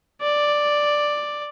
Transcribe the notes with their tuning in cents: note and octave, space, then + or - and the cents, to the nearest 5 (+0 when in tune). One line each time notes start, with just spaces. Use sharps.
D5 +5